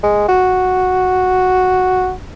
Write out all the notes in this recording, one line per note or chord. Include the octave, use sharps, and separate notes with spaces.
G#3
F#4